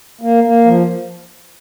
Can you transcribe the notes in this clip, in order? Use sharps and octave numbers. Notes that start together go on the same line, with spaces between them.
A#3
A#3
F3